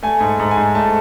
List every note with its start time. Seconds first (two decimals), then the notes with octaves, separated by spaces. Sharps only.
0.03 A3 G#5
0.21 G#2
0.40 G#2
0.51 G#5
0.57 G#2
0.75 A3 A5